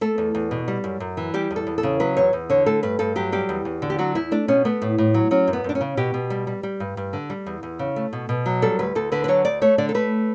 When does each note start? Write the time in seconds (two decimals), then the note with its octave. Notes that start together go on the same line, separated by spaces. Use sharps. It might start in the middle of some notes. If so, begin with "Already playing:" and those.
0.01 A3 A4
0.18 E2
0.35 E2
0.51 B2
0.68 G3
0.84 F#2
1.00 F#2
1.17 E3
1.34 G3 G4
1.51 E2
1.56 A4
1.67 E2
1.78 A4
1.83 C#3
2.00 F#3 B4
2.17 E2 C#5
2.33 E2
2.50 D3 C#5
2.66 A3 A4
2.83 G2 B4
2.99 G2 A4
3.16 F#3 G4
3.32 G3 G4
3.49 E2
3.65 E2
3.82 D3
3.90 G4
3.99 F#3 F#4
4.15 E2 E4
4.31 A3 D4
4.48 B2 C#4
4.65 A3 B3
4.82 A2
4.98 A2
5.14 F#3
5.31 F#3 C#4
5.48 F#2
5.53 B3
5.64 F#2 D4
5.75 C#4
5.81 C#3
5.97 B2 G4
6.14 B2
6.30 G3
6.47 G3
6.63 G3
6.80 G2
6.97 G2
7.13 D3
7.30 G3
7.46 E2
7.63 E2
7.79 C#3
7.96 A3
8.13 B2
8.29 B2
8.46 F#3
8.62 G3 A4
8.79 D2 B4
8.95 D2 A4
9.12 D3 B4
9.24 B4
9.28 F#3 C#5
9.45 D2 D5
9.62 A3 C#5
9.78 D3 D5
9.89 A4
9.94 A3 B4